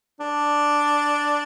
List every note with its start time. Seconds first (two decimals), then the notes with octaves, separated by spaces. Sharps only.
0.20 D4